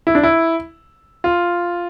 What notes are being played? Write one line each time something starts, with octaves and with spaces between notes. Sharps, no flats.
E4
D4
E4
F4